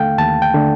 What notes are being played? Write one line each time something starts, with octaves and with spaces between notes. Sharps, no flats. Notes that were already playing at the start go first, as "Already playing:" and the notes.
Already playing: D#2 D3 A3 F5 G5
D#2 A5
G5
D3 A3